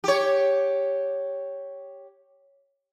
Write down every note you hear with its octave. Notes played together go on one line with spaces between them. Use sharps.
G4 C#5